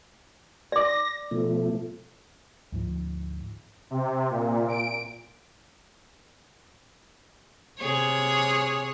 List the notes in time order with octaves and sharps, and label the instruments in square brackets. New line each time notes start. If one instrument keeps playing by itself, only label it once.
[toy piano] D5 D6 [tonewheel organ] A#6
[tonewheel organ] B2 F3 A3
[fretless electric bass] D2 G#2 F3
[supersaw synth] C3
A#2
D7
[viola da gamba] C3 G#4 C#5